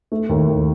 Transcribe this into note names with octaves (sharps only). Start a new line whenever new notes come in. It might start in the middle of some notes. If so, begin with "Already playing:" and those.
A3
D#2
D#2